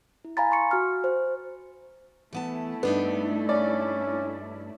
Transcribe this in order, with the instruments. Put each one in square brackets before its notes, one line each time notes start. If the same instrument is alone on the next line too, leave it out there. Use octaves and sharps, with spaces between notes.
[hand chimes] E4
F5 G#5 A#5 B5 A6
C6 C#6 C#7
F#4 F6
C5
[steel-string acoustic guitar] E3 B3 A5 [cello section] A3 E4
[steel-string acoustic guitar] G2 D4 D#4 [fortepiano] B3
[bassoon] C#4 [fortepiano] D5